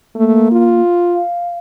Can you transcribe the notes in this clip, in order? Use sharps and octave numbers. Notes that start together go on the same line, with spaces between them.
A3 A#3
F4
F5